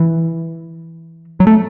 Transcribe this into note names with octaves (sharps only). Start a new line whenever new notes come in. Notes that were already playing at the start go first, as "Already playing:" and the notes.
Already playing: E3
F#3
A3